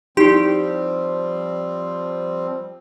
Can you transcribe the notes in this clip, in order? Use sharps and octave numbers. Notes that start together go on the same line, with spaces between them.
F3 G3 C4 D#4 E4 G4